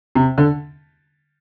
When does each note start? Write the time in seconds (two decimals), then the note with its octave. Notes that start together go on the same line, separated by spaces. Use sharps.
0.15 C3
0.38 D3